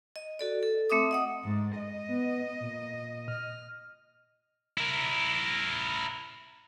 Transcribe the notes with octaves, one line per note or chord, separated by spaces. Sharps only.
D#5
F#4 A4 D5
A4
A3 C4 E5 D6 D#6
D#5 F#5 D#6
G#2
D#5
B3
A#2
F6
E4 A#4